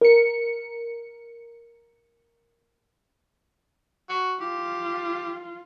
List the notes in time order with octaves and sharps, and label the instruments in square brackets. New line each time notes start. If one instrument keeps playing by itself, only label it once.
[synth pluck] A#4 C#7
[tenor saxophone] F#4
[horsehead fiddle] F4 [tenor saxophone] G4